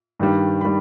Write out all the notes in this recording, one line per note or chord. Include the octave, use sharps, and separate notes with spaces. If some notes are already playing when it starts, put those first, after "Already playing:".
G2 D#3 G3
D#3 G3 B5